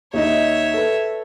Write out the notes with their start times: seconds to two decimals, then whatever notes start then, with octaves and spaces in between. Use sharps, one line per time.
0.13 D#2 D#4 C#5 D#5 E5
0.74 A4 B4